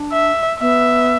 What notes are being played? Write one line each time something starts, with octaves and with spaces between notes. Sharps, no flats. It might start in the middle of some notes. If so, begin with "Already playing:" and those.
Already playing: D4
E5
B3 E5